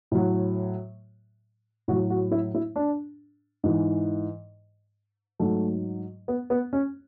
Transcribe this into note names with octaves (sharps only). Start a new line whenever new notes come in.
A2 F#3
A2 F#3 F#4
F#4
E4
E4
D4
G#2 E3
G#2 F#3 A3
B3
B3
C#4